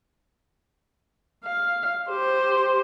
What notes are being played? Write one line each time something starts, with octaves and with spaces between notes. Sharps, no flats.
F5
G4 C5